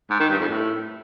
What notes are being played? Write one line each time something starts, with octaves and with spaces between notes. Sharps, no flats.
G#2
D#3
G2
F2
A2